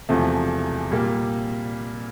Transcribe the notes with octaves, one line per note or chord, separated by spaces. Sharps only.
E1 E2 C3 F3 A3
A#2 G3 A#3